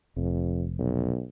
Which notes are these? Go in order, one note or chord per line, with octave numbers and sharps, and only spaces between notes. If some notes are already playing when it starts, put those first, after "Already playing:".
F1 F2
B1